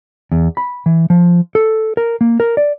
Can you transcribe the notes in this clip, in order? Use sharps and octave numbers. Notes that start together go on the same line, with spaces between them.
E2
B5
E3
F3
A4
A#4
A#3
A#4
D5